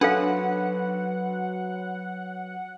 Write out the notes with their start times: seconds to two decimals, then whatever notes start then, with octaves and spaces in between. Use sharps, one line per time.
0.01 F#3 D4 F#4 A4 B4 F5 F#5